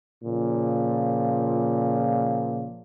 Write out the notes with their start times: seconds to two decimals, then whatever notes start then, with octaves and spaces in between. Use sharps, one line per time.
0.24 A#2 C#3 F3